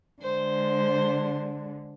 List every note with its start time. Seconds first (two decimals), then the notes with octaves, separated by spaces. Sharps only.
0.22 D3 G#3 C5